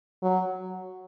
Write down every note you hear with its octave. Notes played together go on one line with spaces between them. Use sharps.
F#3